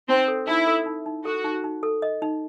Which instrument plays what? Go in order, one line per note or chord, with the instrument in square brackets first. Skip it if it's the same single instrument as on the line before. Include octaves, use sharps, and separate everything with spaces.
[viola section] C4 [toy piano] D#4
[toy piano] A4
[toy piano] D#4 [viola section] E4
[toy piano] A4
D#4
D#4
[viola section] F#4 [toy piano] A4
[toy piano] D#4
D#4
A4
D#5
D#4